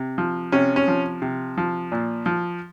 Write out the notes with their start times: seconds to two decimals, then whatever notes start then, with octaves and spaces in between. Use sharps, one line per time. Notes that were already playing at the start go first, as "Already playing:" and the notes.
Already playing: C3
0.18 F3
0.52 C3 C#4
0.76 C#4
0.88 F3
1.22 C3
1.58 F3
1.92 A#2
2.26 F3